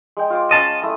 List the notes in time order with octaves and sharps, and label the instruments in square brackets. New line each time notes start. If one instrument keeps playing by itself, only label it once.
[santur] G#3 G#4 G5
F4 C5 D6
[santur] C#4 [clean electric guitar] D#5 A5
[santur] A3 E4 D#6